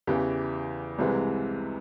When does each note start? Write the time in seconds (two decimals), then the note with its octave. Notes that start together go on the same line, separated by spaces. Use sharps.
0.07 E2 C#3 E3 G4
0.99 C2 C3 E3 G#3